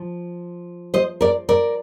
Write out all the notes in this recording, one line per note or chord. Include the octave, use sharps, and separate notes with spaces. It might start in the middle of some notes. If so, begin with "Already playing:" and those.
Already playing: F3
C5 D#5
A#4 D5
A#4 D5